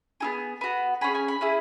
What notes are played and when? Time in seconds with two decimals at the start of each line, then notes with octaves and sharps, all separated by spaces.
0.20 B3 E4 G#4
0.61 B3 F#4
1.01 C#4 G#4 B5
1.15 G#5
1.28 B5
1.41 C#4 E4 G#4